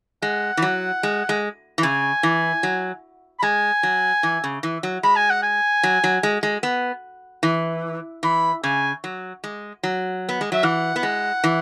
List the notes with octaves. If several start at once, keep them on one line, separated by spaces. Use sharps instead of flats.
G#3 F#5
E3
F#3
G#3
G#3
E3
C#3 G#5
E3
F#3
B5
G#3 G#5
F#3
E3
C#3
E3
F#3
G#3 B5
G#5
F#5
G#5
F#3
F#3
G#3
G#3
B3
E3
E3 B5
C#3 G#5
F#3
G#3
F#3
B3
G#3
F#3 E5
E3 F#5
B3
G#3
E3